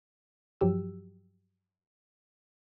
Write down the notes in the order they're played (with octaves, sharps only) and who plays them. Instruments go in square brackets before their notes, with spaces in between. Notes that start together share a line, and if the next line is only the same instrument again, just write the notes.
[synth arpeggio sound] G2 F3 F#3 G4 E6